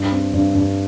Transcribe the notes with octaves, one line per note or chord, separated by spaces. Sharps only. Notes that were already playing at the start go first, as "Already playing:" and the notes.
Already playing: G2
C4
G2
G2